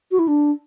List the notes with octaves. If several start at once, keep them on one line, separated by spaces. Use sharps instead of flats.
F#4
E4
D4